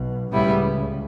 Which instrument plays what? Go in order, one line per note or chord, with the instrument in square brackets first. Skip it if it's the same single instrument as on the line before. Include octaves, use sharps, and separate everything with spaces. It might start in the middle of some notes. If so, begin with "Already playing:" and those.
Already playing: [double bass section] B1 B2
[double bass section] C#2 C#3 [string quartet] A2 G3 B3 E4